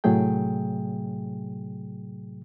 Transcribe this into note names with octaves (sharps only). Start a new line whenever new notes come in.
A2 C3 F#3 A3 G#4 G5